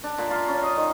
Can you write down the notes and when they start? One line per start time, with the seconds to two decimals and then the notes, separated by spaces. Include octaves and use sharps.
0.04 D4
0.18 A#2
0.30 F4
0.48 C#4
0.63 D#5
0.77 D#3